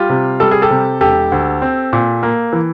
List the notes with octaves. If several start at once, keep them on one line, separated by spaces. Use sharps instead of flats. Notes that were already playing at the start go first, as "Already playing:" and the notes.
Already playing: G3 F4 G4
C3
G3 A4
G#4
G4 A4
C3
E1 G4 A4
D2
C4
A#2
A#3
E3